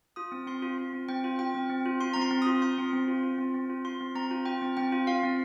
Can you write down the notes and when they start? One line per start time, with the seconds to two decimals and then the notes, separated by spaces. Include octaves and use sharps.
0.16 F4 D#6
0.32 C4
0.47 C4 C6
0.62 F4
0.78 F4
0.93 C4
1.08 C4 G5
1.24 F4
1.39 F4 G5
1.55 C4
1.70 C4
1.85 F4
2.01 F4 C6
2.14 C4 A#5
2.22 C6
2.31 C4
2.42 F4 D#6
2.62 F4 C6
2.78 C4
2.93 C4
3.08 F4
3.23 F4
3.38 C4
3.54 C4
3.70 F4
3.85 F4 C6
4.00 C4
4.15 C4 A#5
4.31 F4
4.45 F4 G5
4.62 C4
4.77 C4 G5
4.92 F4
5.07 F4 F5
5.23 C4